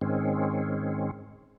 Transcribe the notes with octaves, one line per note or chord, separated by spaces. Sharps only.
G#2 D#3 G#3 C4 C#4